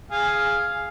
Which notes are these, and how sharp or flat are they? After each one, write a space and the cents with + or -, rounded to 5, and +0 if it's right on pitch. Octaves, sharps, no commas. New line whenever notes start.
G#4 +0 F5 +0